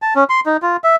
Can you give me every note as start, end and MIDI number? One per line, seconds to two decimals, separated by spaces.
0.02 0.14 81
0.15 0.24 61
0.29 0.40 84
0.46 0.57 63
0.62 0.77 65
0.84 0.96 76